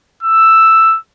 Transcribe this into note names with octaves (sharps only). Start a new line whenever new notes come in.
E6